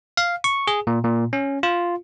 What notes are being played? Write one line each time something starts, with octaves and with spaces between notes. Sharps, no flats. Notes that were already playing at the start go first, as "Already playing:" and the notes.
F5
C#6
G#4
A#2
A#2
C#4
F4